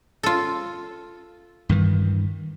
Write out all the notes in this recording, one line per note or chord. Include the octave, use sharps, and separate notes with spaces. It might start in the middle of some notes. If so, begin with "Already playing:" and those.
F4 A4
G2 D#3 E3